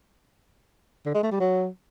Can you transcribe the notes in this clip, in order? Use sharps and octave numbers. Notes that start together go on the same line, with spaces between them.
D3
G#3
A3
G3
F#3